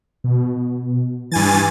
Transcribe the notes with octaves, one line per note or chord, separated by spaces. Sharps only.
B2
G2 E3 G#5 A6